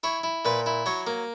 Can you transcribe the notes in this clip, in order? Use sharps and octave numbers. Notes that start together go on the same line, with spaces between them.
E4 C#5
E4
A#2 B4
E4
F#3 C#5
A#3